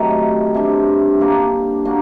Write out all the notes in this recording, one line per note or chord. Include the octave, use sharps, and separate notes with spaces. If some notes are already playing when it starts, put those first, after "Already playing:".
Already playing: C3 D#3 F#3 A3
C3 G3 D4
G3 A#3 D4
A#3 D4 F#4